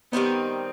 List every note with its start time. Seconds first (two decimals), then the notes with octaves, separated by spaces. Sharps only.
0.12 D#3 G3 B3 C4 D#4